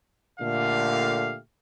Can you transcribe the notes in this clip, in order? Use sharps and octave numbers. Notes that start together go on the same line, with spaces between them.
A#2 D3 A3 G4 F5